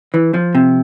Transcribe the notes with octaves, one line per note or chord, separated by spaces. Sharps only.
E3
F3
C3